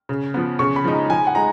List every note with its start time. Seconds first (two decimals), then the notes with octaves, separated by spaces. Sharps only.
0.09 C#3
0.34 F3 B3
0.59 C#3 C#6
0.76 B5
0.84 F3 G#3 D#4
0.93 A#5
1.10 F3 G#5
1.27 F#5
1.35 G#3 D#4 A#5